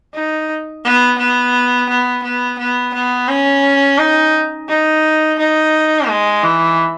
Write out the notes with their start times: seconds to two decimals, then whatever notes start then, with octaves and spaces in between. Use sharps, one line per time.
0.14 D#4
0.84 B3
1.18 B3
1.89 B3
2.23 B3
2.59 B3
2.94 B3
3.29 C#4
3.98 D#4
4.68 D#4
5.39 D#4
6.09 G#3
6.43 E3